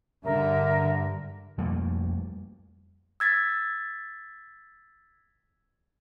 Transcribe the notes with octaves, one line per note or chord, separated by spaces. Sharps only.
G2 D3 A#4 E5
F2 G3 A3 A#3
E6 G#6 A6 B6